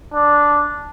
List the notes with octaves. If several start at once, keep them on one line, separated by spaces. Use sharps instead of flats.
D4